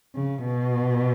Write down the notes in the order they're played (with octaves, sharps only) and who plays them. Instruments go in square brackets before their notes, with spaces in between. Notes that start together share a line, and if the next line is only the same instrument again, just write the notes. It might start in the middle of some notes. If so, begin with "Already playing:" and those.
[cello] C#3
B2